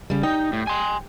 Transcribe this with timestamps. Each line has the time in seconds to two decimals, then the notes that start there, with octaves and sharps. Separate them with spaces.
0.10 C#3 G3
0.23 D#4 G5
0.53 A2
0.67 G#5 C6